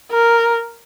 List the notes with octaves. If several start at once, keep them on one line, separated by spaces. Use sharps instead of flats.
A#4